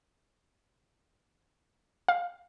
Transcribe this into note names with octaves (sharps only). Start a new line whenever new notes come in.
F5